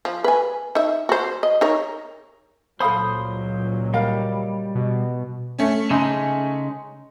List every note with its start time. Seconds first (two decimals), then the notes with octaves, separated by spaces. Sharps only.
0.05 F3
0.24 B4 G#5
0.75 D#4 E5
1.09 F#4 C5
1.43 D#5
1.61 D#4 A#4 C#5
2.80 C#2 A#2 F#3 A4 C5 F5 B5 D#6
3.94 G3 A#4 D#5 F5
4.75 B2
5.59 A3 C#4
5.90 C#3 G#3 D#4